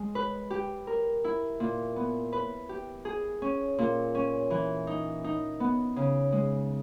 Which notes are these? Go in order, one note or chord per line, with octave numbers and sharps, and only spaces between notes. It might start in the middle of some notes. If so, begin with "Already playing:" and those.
Already playing: G#3
B4
G4
A#4
E4
A#2
B3
B4
G4
G#4
C#4
A#2
C#4
E3
D#4
D#4
B3
C#3
G#3